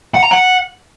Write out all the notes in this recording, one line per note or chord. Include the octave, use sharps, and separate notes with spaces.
F#5
A#5
F#5